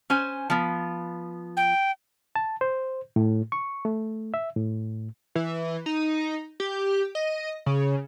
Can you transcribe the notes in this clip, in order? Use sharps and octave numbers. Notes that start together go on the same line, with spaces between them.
C#4 C5 G#5
F3 B3
G5
A5
C5
A2
C#6
A3
E5
A2
E3
D#4
G4
D#5
C#3